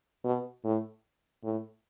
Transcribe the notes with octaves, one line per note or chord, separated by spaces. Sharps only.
B2
A2
A2